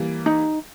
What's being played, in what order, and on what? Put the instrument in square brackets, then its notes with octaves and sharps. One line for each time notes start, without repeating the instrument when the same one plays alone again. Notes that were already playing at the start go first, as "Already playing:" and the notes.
Already playing: [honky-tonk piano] E3 G3 A#3
[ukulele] D#4